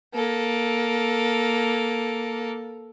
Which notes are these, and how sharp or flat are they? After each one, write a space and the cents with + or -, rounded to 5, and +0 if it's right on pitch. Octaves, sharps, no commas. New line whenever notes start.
A#3 +10 A4 +0